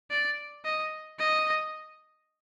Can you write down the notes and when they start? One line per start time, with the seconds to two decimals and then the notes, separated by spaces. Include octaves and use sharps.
0.11 D5
0.65 D#5
1.19 D#5